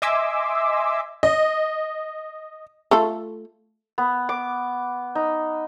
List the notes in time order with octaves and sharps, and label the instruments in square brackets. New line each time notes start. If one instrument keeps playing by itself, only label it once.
[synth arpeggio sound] D#5 E5 G#5 C6 D6 E6
[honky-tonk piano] D#5
[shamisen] A3 F4 A4
[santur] B3
D6
D#4